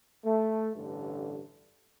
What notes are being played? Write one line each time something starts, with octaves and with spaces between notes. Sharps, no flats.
A3
A1 G2 D3